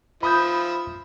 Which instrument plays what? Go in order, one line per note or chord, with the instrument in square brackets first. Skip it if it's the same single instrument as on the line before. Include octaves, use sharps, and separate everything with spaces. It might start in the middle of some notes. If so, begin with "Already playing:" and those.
[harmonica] F3 E5 [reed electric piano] B5 D#6 G6